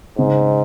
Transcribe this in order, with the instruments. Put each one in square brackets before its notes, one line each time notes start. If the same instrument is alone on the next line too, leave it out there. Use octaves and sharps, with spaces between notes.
[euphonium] G#2 [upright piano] C#3